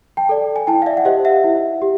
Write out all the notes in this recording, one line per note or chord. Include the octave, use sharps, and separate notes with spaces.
G5 A5
A4 D5
G#5
E4 G5 A5
F5
D5 E5
F#5
G4 C5 D#5 F5
E5 F#5
E4
G4